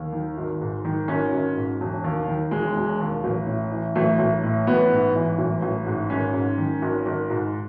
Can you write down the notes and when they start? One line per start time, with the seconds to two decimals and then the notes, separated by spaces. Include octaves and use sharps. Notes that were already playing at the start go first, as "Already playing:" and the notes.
Already playing: D#2
0.13 D#3
0.38 G#1
0.61 G#2
0.85 D#3
1.08 G#1 C#4
1.33 G#1
1.57 G#2
1.81 E1
2.04 D#2
2.28 D#3
2.51 E1 G#3
2.76 E1
3.00 D#2
3.24 A1
3.47 A2
3.71 E3
3.95 A1 A3
4.19 A1
4.43 A2
4.67 A1 B3
4.91 G#2
5.15 E3
5.39 A1
5.62 A1
5.86 G#2
6.10 G#1 C#4
6.34 G#2
6.58 D#3
6.82 G#1
7.06 G#1
7.30 G#2